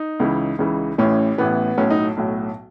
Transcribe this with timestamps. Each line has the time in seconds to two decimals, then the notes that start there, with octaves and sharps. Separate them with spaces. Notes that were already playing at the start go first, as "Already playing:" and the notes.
Already playing: D#4
0.20 C#2 C#3 E3
0.59 C#2 C#3 E3
0.98 A1 A2 E3 C#4
1.38 A1 A2 E3 B3
1.78 B1 A2 F#3 C#4
1.90 D#4
2.17 B1 A2 F#3